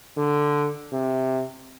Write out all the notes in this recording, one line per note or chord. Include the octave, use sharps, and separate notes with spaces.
D3
C3